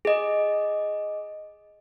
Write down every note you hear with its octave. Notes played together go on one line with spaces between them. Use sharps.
G#4 D#5